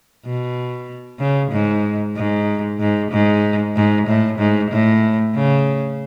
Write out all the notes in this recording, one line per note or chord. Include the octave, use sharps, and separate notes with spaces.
B2
C#3
G#2
G#2
G#2
G#2
G#2
A2
G#2
A2
C#3